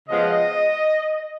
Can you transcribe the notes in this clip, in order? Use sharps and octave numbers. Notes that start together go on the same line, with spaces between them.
C#3 F3 G#3 B3 D#5